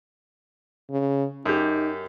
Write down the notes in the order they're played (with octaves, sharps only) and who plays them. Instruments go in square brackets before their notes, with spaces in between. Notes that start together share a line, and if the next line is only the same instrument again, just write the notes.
[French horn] C#3
[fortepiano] F#2 G4 [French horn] D#4